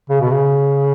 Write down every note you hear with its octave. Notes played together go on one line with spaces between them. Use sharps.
C#3
B2
C#3